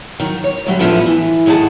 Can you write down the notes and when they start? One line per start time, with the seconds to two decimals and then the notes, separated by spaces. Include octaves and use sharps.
0.20 D#3 F#3
0.44 C#5
0.67 D2 F#3 G3
0.79 A2 D3 F3 A3 B3 D4
1.06 E3
1.46 A2 D#3 G#4 F#5 A5